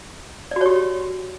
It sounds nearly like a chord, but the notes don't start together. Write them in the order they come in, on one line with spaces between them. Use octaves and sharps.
D5 F#4 C#5 G4